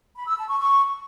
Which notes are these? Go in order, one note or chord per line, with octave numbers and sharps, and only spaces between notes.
B5
E6
A5
C#6
C#6